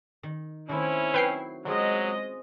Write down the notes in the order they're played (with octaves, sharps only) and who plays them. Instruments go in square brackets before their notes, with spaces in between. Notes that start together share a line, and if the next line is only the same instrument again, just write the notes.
[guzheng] D#3
[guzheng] D#3 A3 C4 [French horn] C#4 [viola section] E4
[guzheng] F#3 [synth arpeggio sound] B4 G5 C7
[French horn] F#3 [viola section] G#3 D#5 [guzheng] C4 C#4 F4